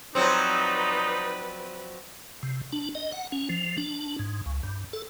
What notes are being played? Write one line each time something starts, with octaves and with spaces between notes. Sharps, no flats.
F3 F#3 C4 D#4 B4 D5
C3
D4
D#5
F#5
C#4
F3
D4
G#2
C#2
G2
A4